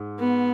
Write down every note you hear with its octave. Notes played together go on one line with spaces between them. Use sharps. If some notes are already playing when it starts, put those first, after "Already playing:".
Already playing: G#2
B3